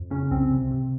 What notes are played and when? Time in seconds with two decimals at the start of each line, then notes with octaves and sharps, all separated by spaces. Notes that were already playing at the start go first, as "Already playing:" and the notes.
Already playing: F2
0.10 C#3 C#4
0.31 C2 C4
0.51 C3
0.71 C3